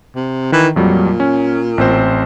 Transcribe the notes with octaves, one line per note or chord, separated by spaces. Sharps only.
C3
D#3 E3
F2 A#2 F#3 G3
C#4
A1 C4 C5